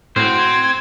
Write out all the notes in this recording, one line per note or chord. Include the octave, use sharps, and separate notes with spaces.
A2 C4 F#4 C5 G#6